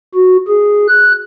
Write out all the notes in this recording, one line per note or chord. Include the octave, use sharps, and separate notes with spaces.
F#4
G#4
F#6